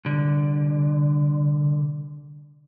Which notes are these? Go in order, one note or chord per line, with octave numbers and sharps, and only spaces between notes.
C2 D3